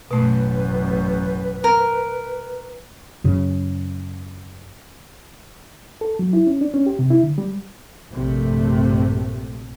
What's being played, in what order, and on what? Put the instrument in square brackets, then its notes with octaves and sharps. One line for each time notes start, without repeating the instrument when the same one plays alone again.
[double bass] A1 F#2 [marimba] B2 A3 [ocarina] B4
[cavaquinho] A#4
[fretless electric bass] F#2 C#3
[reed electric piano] A4
F#3
E4
C#4
D4
C#4
G4
C3
E4
D3
G3
[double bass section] A#1 G2 C3 A3